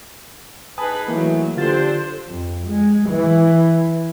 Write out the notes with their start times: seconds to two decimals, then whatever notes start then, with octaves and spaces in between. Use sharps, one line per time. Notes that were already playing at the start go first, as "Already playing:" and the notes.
0.78 D#4 G#4 B4 G#5 A5 D#6
1.08 E3 F#3 A3 A#3
1.57 D3 D4 F4 G4 A4 C5 A6
2.28 F2
2.67 G#3
3.10 E3